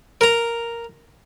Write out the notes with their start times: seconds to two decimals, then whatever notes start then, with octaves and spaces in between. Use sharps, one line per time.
0.21 A#4 A#5